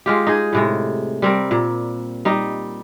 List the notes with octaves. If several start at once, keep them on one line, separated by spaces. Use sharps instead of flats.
G#3 F4 G4
D#4 G#4
A2 C3 G#3
G3 C4 A#4
A#2
G3 D#4